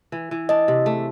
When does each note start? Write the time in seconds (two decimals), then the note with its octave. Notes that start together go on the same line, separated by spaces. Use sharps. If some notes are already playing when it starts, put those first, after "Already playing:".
0.12 E3
0.31 E3
0.49 D4 D#5
0.68 C3
0.86 A3